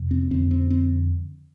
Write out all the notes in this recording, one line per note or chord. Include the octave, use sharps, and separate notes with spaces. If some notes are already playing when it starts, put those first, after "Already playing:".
Already playing: F2 C3
C4
F2 D3 C4
C4
C4